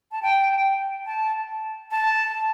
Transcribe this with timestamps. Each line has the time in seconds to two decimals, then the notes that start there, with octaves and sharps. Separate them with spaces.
0.12 A5
0.23 G5
1.06 A5
1.91 A5